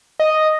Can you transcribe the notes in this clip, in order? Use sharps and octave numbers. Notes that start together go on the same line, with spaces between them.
D#5